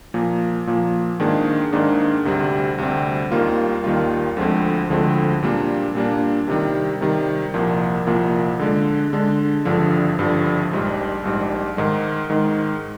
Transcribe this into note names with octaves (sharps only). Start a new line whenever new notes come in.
A#2 F3 A#3
A#2 F3 A#3
G#2 D#3 A#3 D4 G#4
G#2 D#3 A#3 D4 G#4
D2 C3 G3 C4
D2 C3 G3 C4
D#2 D#3 G3 A#3 F4
D#2 D#3 G3 A#3 F4
D2 D3 F3 G#3 C4
D2 D3 F3 G#3 C4
A#2 G3 A#3 D4
A#2 G3 A#3 D4
C3 D#3 G3
C3 D#3 G3
C2 A#2 F3 A#3
C2 A#2 F3 A#3
D3 G#3 D4
D3 G#3 D4
G#1 G2 D3 F3
G#1 G2 D3 F3
A#1 G#2 G3
A#1 G#2 G3
G#2 D#3 G#3
G#2 D#3 G#3